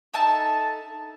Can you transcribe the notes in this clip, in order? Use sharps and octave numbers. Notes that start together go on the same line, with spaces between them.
D#4 A4 E5 A5